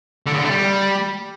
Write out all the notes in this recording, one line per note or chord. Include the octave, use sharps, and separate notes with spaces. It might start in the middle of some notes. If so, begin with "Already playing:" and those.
D3
C#3
D3
A3
G3